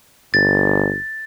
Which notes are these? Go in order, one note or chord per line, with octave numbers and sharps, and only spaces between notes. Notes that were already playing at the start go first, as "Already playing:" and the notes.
G1 A6